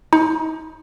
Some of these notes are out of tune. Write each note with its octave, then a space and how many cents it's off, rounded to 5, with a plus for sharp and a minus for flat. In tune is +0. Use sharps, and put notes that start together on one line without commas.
D#4 +40